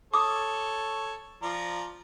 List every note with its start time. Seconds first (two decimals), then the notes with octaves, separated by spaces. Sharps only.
0.14 A4 C#5 D6 D#6
1.43 F3 D5 A#5